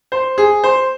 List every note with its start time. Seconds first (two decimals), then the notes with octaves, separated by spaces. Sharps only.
0.12 C5
0.38 G#4
0.64 C5